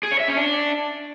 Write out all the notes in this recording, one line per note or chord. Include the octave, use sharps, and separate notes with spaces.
G#4
C#5
E5
C#4
D4